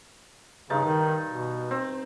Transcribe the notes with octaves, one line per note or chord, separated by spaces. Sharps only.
G2 C#3 D#4 A5
D#3
B2
C4